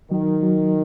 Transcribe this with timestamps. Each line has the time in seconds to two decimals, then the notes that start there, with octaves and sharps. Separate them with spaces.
0.11 D#3 F#3
0.43 F#3